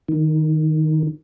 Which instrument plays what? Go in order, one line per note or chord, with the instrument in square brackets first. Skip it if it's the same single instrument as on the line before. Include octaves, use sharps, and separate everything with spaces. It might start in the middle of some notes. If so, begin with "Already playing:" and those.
[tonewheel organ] D#3